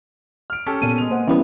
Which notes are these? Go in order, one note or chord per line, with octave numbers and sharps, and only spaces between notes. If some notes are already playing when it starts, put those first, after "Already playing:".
F6 D7
C#4 G4 A4
A#2 B3 D#7
G#3 F7
A#3 C5 F#5
E3 G3 B3 C#4 E4 G4